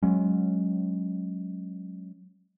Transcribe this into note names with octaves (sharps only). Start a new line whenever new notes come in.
F#3 G#3 C#4